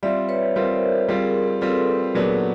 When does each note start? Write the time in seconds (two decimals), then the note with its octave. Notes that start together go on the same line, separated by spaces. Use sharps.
0.03 G3 C4 F4 D5 E5
0.29 B4 C#5
0.56 G3 C4 F4 A#4 C5
1.08 G3 C4 F4 G#4 A#4
1.61 G3 C4 F4 A4 B4
2.15 A#2 F#3 B3 D4